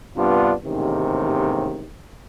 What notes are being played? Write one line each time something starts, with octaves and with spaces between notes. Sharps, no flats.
G2 C3 B3 D4 F4
A1 D#2 G#2 C3 D#3